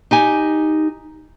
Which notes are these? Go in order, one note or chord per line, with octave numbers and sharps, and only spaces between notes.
D#4 G4 G#5